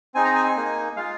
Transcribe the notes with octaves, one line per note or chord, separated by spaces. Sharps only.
C4 D#4 G#4 G#5
A#5
G#5
G#5
A#3 D#4 G#4
G#3 F4 G#4 F5